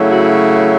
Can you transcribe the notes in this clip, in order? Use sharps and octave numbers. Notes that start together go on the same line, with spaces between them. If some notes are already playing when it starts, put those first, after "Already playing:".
Already playing: C#3 F#3 A3 E4
F#4